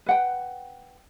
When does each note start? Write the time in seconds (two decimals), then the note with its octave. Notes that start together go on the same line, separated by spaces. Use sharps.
0.06 B4 F#5 G5